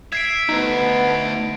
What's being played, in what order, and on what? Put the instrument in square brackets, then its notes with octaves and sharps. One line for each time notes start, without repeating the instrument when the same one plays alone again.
[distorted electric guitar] E5 [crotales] G#6 C7 D7
[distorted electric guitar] D2 [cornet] B3 [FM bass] D#4